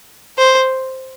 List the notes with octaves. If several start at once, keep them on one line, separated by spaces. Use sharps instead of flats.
C5